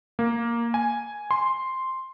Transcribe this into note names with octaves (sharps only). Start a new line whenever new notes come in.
A#3
G#5
C6